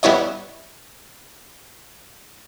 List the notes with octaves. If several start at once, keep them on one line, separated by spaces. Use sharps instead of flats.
G3 B3 E4 C#5 D#5